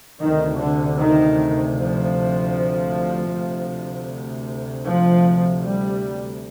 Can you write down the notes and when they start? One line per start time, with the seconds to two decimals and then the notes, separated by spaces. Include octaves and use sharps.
0.20 D2 C3 D#3
0.59 D3
0.98 D#3
1.75 F3
3.30 D2 C3
4.85 F3
5.63 G3